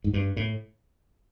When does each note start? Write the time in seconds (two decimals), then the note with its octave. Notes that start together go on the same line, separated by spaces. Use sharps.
0.04 G#2
0.14 G2
0.37 A2